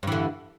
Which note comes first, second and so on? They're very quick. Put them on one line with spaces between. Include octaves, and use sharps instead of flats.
G2 E3 D3